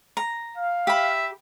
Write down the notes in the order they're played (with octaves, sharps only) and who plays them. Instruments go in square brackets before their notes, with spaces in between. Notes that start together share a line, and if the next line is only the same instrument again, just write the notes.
[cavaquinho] A#5
[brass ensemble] F5
[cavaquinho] G4 B5 [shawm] E5